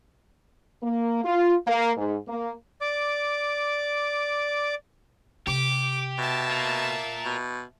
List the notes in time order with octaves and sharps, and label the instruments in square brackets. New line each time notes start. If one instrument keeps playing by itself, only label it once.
[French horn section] A#3
F4
A#3
G#2
A#3
[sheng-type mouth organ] D5 D6
[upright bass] C3 [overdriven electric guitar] G4 [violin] D6
[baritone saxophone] B2 [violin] E5 A5
[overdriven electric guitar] F4 A#4
[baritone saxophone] B2